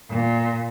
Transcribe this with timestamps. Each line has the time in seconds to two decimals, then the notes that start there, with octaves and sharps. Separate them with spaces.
0.10 A#2